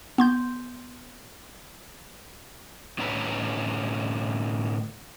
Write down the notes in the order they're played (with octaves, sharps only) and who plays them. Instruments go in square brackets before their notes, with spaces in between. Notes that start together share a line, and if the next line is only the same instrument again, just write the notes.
[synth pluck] B3 C6 G6
[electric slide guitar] A2 D3 C#4 B4 A#5